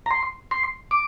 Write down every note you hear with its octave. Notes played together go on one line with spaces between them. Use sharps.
A#5
C6
C6
D6